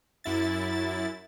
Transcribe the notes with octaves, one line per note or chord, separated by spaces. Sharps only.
F#2 E4 A6